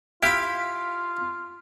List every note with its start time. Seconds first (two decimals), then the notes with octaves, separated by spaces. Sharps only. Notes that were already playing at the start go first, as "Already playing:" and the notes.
0.23 E4 F4 G4 F5 B5